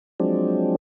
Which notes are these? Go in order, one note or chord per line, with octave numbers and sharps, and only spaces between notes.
F3 F#3 G#3 C4 D4